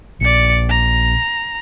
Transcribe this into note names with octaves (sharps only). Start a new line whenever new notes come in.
A#1 D5 C#7
A#5